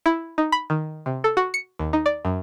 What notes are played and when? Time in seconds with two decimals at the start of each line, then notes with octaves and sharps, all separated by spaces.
0.06 E4
0.38 D#4
0.52 B5
0.70 D#3
1.06 C3
1.24 A4
1.37 F#4
1.54 C#7
1.79 D#2
1.93 D#4
2.06 D5
2.25 F#2